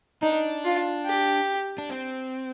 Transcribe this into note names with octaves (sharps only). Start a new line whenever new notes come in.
D4 D#4
F4
G4
D4
C4